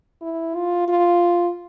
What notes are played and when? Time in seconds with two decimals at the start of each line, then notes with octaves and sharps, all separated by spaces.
0.22 E4
0.55 F4
0.89 F4